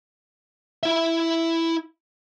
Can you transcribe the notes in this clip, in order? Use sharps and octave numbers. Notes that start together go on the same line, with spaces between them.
E4 E5